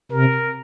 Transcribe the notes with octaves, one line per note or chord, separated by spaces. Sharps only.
C3 A#4